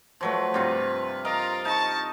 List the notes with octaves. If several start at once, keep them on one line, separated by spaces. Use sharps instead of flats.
F3 F#3 A3 B4
G2 C3 F4
F4 A#4 D#5 A#5
D#4 A5 C#6